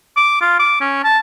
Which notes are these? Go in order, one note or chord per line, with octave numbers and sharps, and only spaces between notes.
D6
F4
D6
C#4
A5